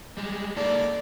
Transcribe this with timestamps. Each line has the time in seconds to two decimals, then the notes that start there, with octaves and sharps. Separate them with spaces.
0.17 G3 G#3
0.56 A#3 D#4 A4 D5